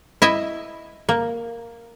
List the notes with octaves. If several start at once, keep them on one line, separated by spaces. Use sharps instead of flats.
E4 D#5 E5
A#3